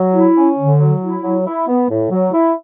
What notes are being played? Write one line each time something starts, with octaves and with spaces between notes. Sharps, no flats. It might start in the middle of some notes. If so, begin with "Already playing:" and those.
Already playing: F#3
E4
C#4
D3
F#3
E4
F#3
E4
B3
A2
F#3
E4